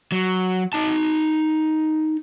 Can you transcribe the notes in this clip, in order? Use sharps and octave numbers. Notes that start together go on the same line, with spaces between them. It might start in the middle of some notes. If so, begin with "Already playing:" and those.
F#3
D#4 A5